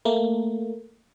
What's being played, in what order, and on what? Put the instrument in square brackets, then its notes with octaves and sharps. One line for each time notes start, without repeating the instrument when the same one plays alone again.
[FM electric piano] A3 A#3